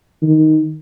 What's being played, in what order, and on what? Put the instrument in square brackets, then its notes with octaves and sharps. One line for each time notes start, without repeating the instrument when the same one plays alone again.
[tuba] D#3